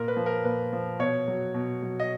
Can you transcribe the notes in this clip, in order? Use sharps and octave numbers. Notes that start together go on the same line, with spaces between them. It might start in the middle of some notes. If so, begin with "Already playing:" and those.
Already playing: A#2 A#4
B4
F3
A#4
A#2 B4
F3
B2 C#5
F#3
B2
F#3
D#5